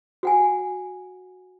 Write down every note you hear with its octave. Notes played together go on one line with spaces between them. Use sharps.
F#4 F#5 G#5